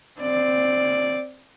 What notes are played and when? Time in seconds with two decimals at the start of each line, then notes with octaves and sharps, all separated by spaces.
0.21 C4 D5